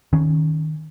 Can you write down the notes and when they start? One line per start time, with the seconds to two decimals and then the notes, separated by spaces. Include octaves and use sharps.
0.13 D#3 C#4